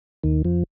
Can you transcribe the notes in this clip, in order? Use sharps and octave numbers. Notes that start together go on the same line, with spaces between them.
D#2 D#3
F2 F3